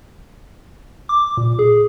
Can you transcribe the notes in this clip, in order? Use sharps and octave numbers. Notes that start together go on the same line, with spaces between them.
D6
A#2
G#4